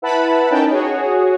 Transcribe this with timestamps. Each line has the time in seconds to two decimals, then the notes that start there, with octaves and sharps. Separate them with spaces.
0.02 E4 B4 F#5 A5 B5
0.51 C#4 D#4 A#4 G5 A5
0.71 F#4 G#4 C#5